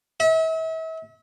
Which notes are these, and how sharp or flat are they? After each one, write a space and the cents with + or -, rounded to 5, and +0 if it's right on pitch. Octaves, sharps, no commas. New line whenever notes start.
E5 -40